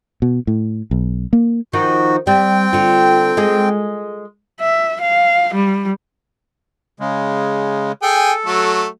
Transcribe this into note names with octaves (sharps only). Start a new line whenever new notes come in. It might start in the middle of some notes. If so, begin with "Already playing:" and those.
B2
A2
B1
A#3
D#3 F3 D#4 F#4
G3 C4 G5
D3 F4
G#3 G#4
E5
F5
G3
C#3 G#3
G#4 A4 G5 G#5
F#3 A3